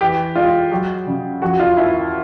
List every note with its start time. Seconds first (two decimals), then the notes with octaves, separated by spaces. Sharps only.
0.01 E3 G4
0.35 G#3 F4
0.72 F#3 G4
1.07 C#3
1.42 F3 F#4
1.59 F4
1.77 D#2 E4